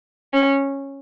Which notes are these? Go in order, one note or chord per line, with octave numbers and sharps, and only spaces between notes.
C#4